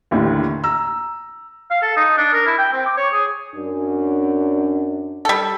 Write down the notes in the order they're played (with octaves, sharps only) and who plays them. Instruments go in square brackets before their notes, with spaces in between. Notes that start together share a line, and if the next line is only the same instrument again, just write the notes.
[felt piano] A1 D#2 A2 D3
A#5 E6
[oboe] F5
A4
D#4
D4
A#4
E4
G5
C4
D6
C#5
G#4
[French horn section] F#2 D4
[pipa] G3 A4